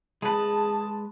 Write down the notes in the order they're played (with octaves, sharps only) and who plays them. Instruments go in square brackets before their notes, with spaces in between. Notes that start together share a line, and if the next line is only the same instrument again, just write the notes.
[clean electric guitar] G#3 B4 [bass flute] G#4 [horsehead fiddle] A5